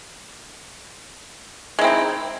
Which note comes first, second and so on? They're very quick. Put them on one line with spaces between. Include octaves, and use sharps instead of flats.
G#3 E4 C4 D#4